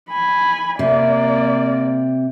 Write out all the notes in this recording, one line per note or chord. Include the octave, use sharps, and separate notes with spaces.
G#5 B5
C3 A#3 D5